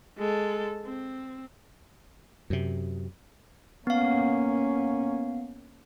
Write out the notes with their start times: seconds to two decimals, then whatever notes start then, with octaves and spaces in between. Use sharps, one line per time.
0.17 G#3 A4
0.85 C4
2.50 F#2 C3
3.87 A#3 B3 C#4 F5